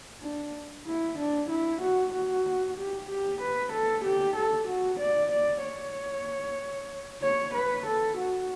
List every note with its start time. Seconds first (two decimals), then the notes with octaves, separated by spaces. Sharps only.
0.22 D4
0.86 E4
1.18 D4
1.50 E4
1.82 F#4
2.13 F#4
2.77 G4
3.09 G4
3.41 B4
3.73 A4
4.05 G4
4.36 A4
4.68 F#4
5.00 D5
5.32 D5
5.64 C#5
7.23 C#5
7.54 B4
7.86 A4
8.18 F#4